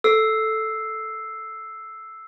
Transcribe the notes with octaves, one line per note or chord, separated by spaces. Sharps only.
A4 E6 C7